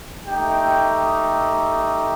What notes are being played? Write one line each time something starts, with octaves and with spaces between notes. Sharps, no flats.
A3 D#4 G4 G5